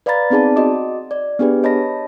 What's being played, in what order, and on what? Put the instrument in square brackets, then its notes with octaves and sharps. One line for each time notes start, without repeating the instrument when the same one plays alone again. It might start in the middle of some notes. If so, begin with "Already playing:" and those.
[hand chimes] B4 D5 F5 A#5 B5 A6
B3 C4 D#4 G#4 D5 A5
F#4 D#5 D6
D5
B3 D4 G4 G#4 B4
C#5 D#5 A5 B5 A#6